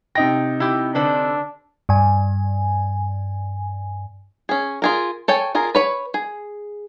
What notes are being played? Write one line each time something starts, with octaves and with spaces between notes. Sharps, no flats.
C3 D#4 G5 A#6
E4 G4
D3 D4 B4 C5
G2 G#5
C#4 G#4
F4 G#4 A#4
A4 C#5 G5 G#5
F4 G#4 A#4
B4 C#5 B5
G#4